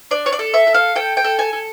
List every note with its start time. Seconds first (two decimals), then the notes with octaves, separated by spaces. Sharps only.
0.11 D4 D5
0.26 C#5
0.33 D5
0.39 A4
0.54 E5
0.67 A4
0.74 F5
0.95 A4 G5
1.17 G5
1.24 A4
1.39 G#5
1.53 A4